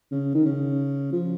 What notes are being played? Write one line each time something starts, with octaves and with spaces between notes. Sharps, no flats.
C#3
D#3
C#3
F3